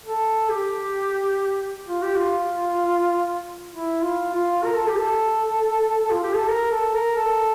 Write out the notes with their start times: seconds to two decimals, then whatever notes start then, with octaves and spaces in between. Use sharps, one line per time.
0.05 A4
0.50 G4
1.88 F4
2.02 G4
2.16 F4
3.73 E4
4.02 F4
4.34 F4
4.64 A#4
4.75 A4
4.88 G4
4.98 A4
6.10 F4
6.24 G4
6.36 A4
6.48 A#4
6.71 A4
6.94 A#4
7.16 A4